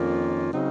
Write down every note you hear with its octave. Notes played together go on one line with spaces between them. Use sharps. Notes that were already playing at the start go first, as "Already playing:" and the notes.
Already playing: F2 D#3 A#3 C#4 F4
C#3 F#3 C4 D#4